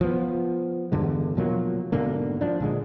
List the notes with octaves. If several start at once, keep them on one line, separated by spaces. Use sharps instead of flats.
F3 B3
E2 G2 D3 G#3
B2 F3 F#3 A#3
G#2 B2 D3 A#3
F3 D4
A#2 D3 G#3